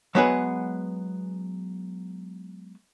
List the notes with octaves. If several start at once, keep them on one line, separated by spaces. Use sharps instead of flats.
F#3 G#3 B3 F#4 G#4 B4